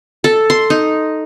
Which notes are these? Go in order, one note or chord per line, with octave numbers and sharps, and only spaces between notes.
A4
C6
D#4